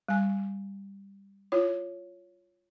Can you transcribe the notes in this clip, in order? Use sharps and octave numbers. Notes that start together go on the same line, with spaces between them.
G3 G#5
E4 F4 C#5